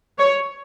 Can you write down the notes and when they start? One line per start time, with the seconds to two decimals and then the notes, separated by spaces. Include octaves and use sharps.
0.19 C#5